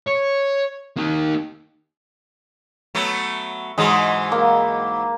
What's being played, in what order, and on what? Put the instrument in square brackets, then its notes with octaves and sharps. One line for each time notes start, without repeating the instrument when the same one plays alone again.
[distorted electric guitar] C#5
A#3 D#4
[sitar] F#3 A3 B3
[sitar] G#2 E3 F#3 [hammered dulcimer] G#3
[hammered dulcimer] A#3